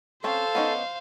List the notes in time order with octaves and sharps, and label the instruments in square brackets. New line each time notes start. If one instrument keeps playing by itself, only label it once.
[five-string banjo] C4 C#4 [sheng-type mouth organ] A4 [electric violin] C5 F5
[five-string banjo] B3 C#4 D#4